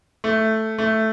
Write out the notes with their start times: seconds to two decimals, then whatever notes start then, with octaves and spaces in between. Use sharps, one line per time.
0.24 A3
0.78 A3